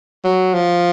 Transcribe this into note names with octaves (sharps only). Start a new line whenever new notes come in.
F#3
F3